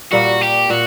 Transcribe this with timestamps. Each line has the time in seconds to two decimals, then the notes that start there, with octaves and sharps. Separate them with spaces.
0.11 A#2 G3 A#3 F#4
0.41 G4
0.70 A#2 F#4